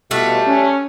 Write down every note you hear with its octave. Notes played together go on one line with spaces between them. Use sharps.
B2 G3 A3 D4 F4 F#4
C#4